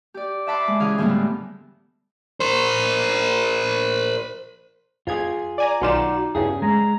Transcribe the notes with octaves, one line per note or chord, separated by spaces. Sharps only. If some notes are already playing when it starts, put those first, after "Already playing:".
G4 D5
E5 F#5 A5 B5 C6 D6
G#3 B5
C#3 E3 G#4 F5 D#6
A2 D3 E3 G3 G#3 B3
A#4 C5
F2 F4 G#4 G#6
D5 G#5 A#5
B1 D#4 F4 F#4 D5 E7
E2 G2 C#3 G#4
G#3 A#5